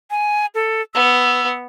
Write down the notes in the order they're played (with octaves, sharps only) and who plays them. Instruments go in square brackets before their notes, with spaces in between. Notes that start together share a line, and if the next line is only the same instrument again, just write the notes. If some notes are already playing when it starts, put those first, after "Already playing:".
[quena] G#5
A4
[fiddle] B3 [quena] E6